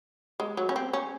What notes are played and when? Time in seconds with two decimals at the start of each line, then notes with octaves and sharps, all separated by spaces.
0.40 G#3
0.57 F#3
0.69 C#4
0.76 C4
0.93 C#4